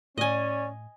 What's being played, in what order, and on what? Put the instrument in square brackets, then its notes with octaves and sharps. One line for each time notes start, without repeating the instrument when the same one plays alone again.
[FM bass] A2 [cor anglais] C#4 [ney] D5 [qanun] D#5 G#5